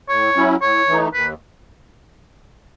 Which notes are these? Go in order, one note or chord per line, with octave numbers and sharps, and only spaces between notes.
A2 C#5
F#3 C#4 E4
A2 C#5
E3 A3 D#4
D#2 B4